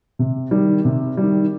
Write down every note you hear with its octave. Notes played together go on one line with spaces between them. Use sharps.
C3
D#3 G3
C3
G3
D#3